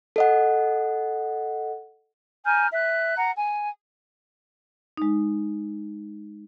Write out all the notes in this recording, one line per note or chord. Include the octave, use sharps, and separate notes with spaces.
A4 D#5 F#5
G#5 A#5 F6 G6
E5 F#6
F#5 A#5
G#5
G#3 D#4